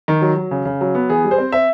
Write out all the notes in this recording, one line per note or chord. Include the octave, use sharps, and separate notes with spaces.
D#3
F#3
F#3
C#3
C#3
F#3
B3
E3 G#4
G3
C5
C4
C4 E5